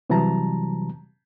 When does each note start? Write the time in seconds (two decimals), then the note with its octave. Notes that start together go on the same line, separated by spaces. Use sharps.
0.10 C3 E3 F#3 G3 A5 A#5